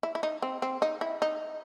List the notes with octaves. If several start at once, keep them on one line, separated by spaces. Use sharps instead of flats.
E4
E4
D#4
C4
C4
D#4
E4
D#4